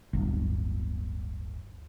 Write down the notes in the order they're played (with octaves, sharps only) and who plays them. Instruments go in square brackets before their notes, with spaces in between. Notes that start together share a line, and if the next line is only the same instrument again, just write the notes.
[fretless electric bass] D1 G1